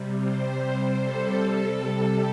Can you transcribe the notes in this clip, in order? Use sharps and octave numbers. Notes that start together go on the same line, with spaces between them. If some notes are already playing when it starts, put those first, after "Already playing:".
Already playing: C3 G3
C5
C3 G3
A4
C3 G3 A4